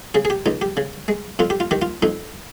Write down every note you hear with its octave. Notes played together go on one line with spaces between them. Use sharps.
C#3 G#4
G#4
G4
C#2 D#4
G4
C#3
G#3
F2 F4
G4
F4
D#3 G4
F4
F2 D#4